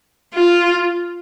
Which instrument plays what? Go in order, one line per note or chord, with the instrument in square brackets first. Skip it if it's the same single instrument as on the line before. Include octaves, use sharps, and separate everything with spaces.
[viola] F4